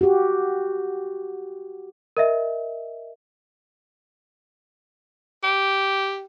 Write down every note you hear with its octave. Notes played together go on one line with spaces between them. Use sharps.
F#4 G4
A#4 D#5 E5
G4